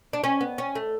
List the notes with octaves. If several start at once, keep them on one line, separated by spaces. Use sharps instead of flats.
D4
C#4
B3
C#4
A3